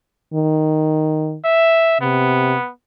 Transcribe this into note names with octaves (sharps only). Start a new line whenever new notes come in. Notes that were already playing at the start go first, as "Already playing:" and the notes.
D#3
E5
C3 B3